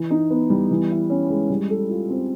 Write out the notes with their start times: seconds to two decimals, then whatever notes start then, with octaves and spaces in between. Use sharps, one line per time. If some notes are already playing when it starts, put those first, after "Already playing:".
Already playing: E3
0.10 D#4
0.30 B3
0.50 G3
0.71 E3
0.91 E4
1.10 C#4
1.30 G#3
1.50 G3
1.70 A4
1.89 F4
2.10 C4